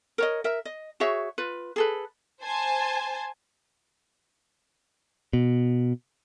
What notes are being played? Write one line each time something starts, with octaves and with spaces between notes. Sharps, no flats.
A#4 C#5 D#5
A#4 E5
D#5
F#4 G#4 C#5 E5
F4 B4
G#4 A4 B4
C5 G#5 A5
B2